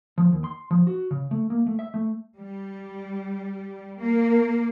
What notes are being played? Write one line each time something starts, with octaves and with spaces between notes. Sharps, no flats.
F3
D#2
C6
F3
F#4
C#3
A3
A#3
A3
E5
A3
G3
A#3